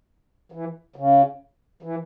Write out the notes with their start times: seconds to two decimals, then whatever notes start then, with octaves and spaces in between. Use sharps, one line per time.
0.52 E3
0.96 C#3
1.83 E3